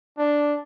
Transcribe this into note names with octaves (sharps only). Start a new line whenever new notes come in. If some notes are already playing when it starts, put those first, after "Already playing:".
D4